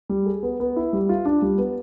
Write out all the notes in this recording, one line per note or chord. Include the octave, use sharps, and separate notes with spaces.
G3
G#4
B3
B3
E4
G3
F4
D4
G3
B3